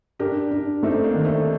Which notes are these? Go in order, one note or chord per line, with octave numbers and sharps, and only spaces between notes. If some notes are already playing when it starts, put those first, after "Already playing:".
D4 G4 A#4
D4
A3 C4 D#4
A#3 D4
D#3
A3 C4